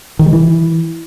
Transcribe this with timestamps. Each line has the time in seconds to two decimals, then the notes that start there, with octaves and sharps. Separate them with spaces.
0.19 D#3
0.26 G3
0.33 E3